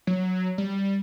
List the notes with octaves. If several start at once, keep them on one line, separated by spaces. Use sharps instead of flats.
F#3
G3